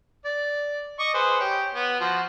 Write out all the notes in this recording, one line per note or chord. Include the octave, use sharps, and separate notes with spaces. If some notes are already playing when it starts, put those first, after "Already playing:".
D5
D#5 C#6 D6
G#4 B4 C5
G4 C#5
B3
F3 F#4